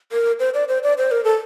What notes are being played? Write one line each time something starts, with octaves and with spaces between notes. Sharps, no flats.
A#4
C5
D5
C5
D5
C5
A#4
A4